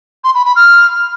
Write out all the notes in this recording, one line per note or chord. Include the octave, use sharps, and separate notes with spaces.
C6
B5
B5
F6